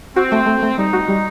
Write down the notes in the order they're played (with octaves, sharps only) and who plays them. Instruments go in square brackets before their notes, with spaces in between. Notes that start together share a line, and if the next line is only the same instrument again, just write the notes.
[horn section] C4 [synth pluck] F#4
[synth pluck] A3
A3
A3
[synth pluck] G3 [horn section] D#4
[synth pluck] F#4
G3